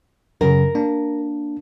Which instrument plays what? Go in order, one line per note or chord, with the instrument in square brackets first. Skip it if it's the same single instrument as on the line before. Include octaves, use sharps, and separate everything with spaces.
[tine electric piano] F#2 C#3 [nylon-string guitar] A#4
[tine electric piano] A#3 D4